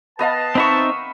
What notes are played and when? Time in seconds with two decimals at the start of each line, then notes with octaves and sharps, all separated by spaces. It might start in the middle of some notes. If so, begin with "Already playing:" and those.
0.19 B3 B4 D#5 F5 A5
0.55 C4 D#4 D#5 E5 B5 C#6